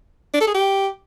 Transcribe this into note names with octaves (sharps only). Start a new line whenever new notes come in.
D4
A4
G#4
G4